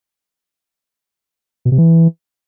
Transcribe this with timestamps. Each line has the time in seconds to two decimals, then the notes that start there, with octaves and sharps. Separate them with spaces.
1.65 B2
1.72 C3
1.78 E3